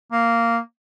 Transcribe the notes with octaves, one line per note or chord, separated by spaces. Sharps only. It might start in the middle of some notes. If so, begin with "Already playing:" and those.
A#3